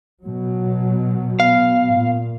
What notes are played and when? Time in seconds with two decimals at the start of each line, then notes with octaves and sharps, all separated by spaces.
0.24 B2 F#3
1.40 B3 F5
1.94 A#2